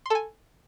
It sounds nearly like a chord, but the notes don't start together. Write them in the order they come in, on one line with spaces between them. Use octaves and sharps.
C6 A4 G#5